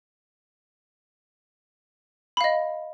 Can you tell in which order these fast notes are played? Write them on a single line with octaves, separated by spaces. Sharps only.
B5 F5 D#5